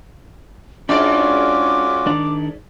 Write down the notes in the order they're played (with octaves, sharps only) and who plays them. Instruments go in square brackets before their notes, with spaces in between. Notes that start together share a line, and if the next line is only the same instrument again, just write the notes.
[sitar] G#2 D5 [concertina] C#4 F4 F#4 [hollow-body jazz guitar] D4 [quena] D6
[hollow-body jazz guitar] D#3 D4